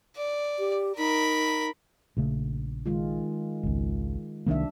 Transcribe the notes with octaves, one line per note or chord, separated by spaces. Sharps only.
D5
G4
D#4 A#4 B5
A#1 C#3 A3
D#3 G#3 F4
G#1 C#2
C2 D#3 G3 A#3 D4 E5